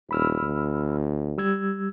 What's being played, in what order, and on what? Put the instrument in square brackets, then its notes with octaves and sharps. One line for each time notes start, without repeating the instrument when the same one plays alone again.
[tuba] D#1 [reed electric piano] B5 E6 F6
[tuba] D2
[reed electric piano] G3 E6 G#6